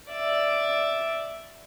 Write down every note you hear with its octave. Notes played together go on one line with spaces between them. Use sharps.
D5 E5